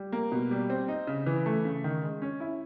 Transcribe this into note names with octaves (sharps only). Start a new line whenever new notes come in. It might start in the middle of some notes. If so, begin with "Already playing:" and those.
Already playing: G3
A#3
B2
G3
C4
D#4
C#3
E3
A3
C#3
D#3
G#3
C#4
E4